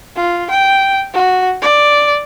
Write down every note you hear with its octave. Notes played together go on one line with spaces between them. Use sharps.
F4
G5
F#4
D5